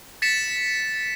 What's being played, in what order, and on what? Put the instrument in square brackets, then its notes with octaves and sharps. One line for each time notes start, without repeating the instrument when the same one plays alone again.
[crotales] A6 B6 C#7 E7